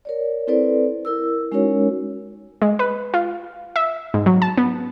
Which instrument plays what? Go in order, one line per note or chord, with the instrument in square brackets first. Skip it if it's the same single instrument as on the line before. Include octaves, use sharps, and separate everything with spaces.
[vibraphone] A#4 C#5 D5
C4 E4 A4 B4 C5 D5
E4 A#4 E6
G#3 C#4 D#4 F#4 A#4 C#5
[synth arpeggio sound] G#3
B4
F4
E5
G#2
F#3
A5
B3